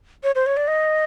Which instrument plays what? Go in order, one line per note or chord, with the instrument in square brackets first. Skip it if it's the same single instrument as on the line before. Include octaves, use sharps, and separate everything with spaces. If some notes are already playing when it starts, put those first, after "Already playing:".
[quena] C#5
C5
C#5
D5
D#5